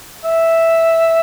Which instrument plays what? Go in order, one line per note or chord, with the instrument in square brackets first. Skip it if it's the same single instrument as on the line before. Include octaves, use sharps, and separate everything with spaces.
[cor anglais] E5